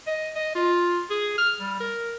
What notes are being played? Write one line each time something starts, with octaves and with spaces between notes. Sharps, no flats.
D#5
D#5
F4
G#4
F6
G3
A#4